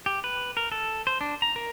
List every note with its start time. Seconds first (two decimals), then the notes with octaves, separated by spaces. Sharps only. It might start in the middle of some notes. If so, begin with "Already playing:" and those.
0.06 G4
0.24 B4
0.57 A#4
0.72 A4
1.07 C5
1.21 D4
1.42 A#5
1.56 A#4